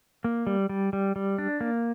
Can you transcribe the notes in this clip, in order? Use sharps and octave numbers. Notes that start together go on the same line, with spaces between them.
A#3
G3
G3
G3
G3
D4
A#3